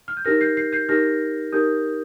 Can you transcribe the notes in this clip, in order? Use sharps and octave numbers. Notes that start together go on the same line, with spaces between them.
F6
G6
D#4 G4 A#4 F6 A#6
G6 C7
G6 C7
G6 C7
D#4 G4 A#4 F6 A#6
D#4 G4 A#4 D#6 G6